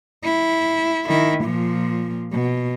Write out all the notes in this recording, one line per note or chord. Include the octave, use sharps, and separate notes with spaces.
E4
D#3 E4
A#2 F3
B2